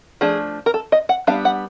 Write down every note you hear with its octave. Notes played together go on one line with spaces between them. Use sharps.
F3 A3 D4 G#4
A#4
A4
D#5
F#5
G3 B3 D4 F5
F#5